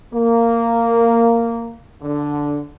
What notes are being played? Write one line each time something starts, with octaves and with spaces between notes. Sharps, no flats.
A#3
D3